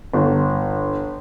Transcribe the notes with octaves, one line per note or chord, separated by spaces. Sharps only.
G1